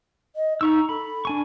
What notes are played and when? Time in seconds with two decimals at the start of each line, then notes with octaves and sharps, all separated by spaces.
0.36 D#5
0.61 D#4 A#5 C#6 E6
0.89 A4 B5
1.25 D4 G#5 C#6